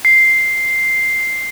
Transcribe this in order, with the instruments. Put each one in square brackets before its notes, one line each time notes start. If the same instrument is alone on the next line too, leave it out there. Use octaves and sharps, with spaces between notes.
[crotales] C7